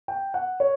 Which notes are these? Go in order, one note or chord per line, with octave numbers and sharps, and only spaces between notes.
G5
F#5
C#5